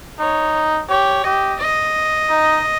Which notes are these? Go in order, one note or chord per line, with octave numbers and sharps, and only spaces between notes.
D#4 C#5
G4 C#5
G4 D#5
D#5
D#4